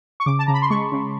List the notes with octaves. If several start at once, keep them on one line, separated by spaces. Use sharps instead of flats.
C#6
C#3 D6
A5
C#3 A#5
B5
C6
G#3 C#6
C#3